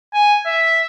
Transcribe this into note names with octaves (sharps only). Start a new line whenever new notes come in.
G#5
E5